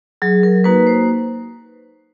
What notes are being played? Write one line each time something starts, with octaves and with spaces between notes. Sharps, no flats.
F#3 G#4
A#4
A#3 D#4 F#4 B4
C5